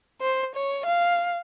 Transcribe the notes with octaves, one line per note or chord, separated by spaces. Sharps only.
C5
C#5
F5